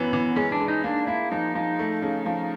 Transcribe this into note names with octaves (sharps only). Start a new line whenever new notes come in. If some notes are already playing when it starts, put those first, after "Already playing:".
Already playing: F#2 E3 F#3 B3
E3
G#3 C#4
D4
G#3
D#4
A#3 D4
A#3 E4
F3 D#4
F3 D#4
A3
C#3
F3